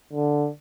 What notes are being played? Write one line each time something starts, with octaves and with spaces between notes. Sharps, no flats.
D3